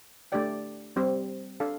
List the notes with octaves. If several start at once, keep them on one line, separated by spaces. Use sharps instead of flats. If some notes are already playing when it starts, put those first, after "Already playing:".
A3 D4 G4 D5 G5
G3 C4 G4 C5
D4 A4 F5